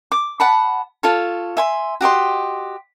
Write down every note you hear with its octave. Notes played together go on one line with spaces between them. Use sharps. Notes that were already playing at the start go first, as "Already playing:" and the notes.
D6
F#5 A5 B5
F4 A4 C#5
E5 G#5 C6
F#4 G4 D#5 C6